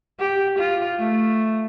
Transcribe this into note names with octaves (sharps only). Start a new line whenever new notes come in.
G4
F4
A3